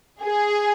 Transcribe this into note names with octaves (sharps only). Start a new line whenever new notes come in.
G#4